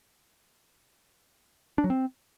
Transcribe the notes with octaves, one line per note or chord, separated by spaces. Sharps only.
D4
F#3
C4